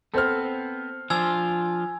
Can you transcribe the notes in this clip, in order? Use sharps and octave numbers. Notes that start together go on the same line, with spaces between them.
B3 C4 A4 C5 F6
F3 D4 F4 G#5 E6 G#6